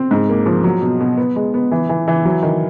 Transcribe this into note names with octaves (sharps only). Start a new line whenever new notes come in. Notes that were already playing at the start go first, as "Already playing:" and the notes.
Already playing: C4
G#2
A#3
F3
F#3
B2
B2
B3
G#3
B3
E3
E3
E3
F#3
D#3